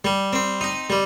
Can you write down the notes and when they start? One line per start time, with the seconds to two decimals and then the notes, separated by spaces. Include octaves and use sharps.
0.05 G3
0.33 C4
0.61 D#4
0.90 G3